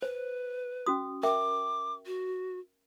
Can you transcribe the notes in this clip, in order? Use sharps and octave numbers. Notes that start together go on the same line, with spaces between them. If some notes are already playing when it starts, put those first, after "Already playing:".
B4 C5
C#4 F#4 D#6
A#4 E5 G5 D6
F#4